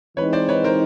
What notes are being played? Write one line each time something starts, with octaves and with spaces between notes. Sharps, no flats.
E3 G#3 C4 D#4 B4 C#5
C5 D5
B4 C#5
A#4 C5